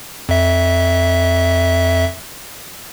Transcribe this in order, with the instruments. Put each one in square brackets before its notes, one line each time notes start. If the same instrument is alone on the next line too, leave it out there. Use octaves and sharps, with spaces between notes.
[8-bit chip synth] F2 E5